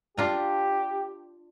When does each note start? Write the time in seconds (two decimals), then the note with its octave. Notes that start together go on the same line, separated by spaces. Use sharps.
0.18 D4 F4 G4 A#5